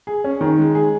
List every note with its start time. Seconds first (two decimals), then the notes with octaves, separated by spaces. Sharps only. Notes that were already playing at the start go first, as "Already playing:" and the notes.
0.07 G#4
0.24 C#4
0.41 D#3
0.58 G#3
0.75 G#4